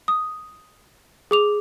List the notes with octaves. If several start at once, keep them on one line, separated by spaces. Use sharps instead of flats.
D#6
G#4 D6 F7